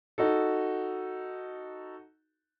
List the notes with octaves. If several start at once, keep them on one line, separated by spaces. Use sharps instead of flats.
D#4 F#4 A4